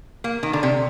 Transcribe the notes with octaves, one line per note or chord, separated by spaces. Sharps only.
A#3
D#3
D3
C3